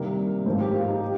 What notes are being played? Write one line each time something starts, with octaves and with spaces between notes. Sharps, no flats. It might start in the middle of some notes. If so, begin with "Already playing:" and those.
Already playing: C3 D#3 G3 A#3
G#2 F3 A#3 C5
G4
F4
D#4
G4